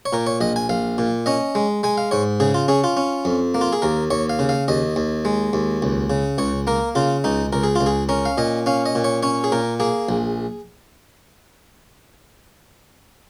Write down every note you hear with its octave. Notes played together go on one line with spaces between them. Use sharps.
C#5
A#2 A#4
C#5
A#1 D#5
G#5
A#1 F5
A#2
C#4 D#5
G#3
G#3 G#5
F5
G#2 C#5
C#3 G#4
F4
C#4 G#4
F4
C#4
F2
A#3
F4
G#4
D#2 A#4
D#2 C#5
F5
C#3
F5
D#2 D#5
D#2
G#3
D#2
C#2
C#3
C#2 C#5
A#3 A#4
C#3 F4
C#2 D#4
C#2 A#4
G#4
C#2 F4
G#4
C#4 A#4
F5
A#2 D#5
C#4 F5
D#5
A#2
C#5
C#4 C#5
G#4
A#2 A#4
A#3 G#4
A#1